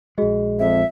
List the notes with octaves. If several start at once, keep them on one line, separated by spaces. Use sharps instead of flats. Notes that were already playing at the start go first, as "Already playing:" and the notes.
A#1 G#3 F#4 G#4 D#5
F2 E5